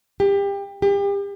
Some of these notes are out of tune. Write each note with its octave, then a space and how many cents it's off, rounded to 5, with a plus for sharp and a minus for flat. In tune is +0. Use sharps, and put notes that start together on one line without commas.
G4 +25
G4 +35